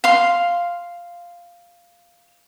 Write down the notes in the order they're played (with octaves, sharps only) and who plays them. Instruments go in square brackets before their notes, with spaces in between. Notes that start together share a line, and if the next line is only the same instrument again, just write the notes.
[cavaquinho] F5 C6